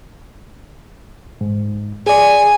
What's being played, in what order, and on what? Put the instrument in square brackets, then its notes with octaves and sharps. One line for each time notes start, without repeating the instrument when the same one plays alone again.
[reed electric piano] G#2
[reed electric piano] G#4 D5 [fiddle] G#5